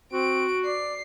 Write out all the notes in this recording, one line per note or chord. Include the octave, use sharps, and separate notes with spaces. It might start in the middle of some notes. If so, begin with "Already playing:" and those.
C4 F#4 D7
D5 C7